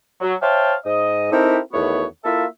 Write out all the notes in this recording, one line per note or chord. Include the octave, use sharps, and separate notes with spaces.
F#3
C5 C#5 E5 F5 G5 A5
G#2 D#5
C4 D#4 E4 G4 A4 A#4
E2 D#3 A3 B3 F#4 C#5
A#3 E4 F4 A4 E5